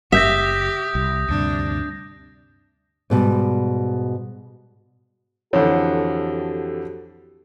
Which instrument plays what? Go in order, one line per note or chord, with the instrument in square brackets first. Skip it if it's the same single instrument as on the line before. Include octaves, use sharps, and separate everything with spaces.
[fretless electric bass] F#1 [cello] G4 [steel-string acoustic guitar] E5 [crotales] D#6 G6 A#6
[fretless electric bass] C2
[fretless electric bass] D2 G2 C3 [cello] D4
[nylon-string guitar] G#2 B2 G3
[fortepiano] F2 D3 [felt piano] E3 [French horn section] F#4 G4 A4 [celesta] C#5